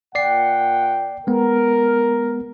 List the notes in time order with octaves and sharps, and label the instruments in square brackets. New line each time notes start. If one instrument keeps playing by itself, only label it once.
[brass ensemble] A#2 F#5 G5 [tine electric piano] D5 C7
[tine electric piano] G#3 B3 [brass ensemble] A#4